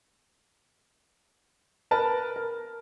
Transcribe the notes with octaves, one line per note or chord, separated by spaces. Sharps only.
A#4 B4 A5
A#4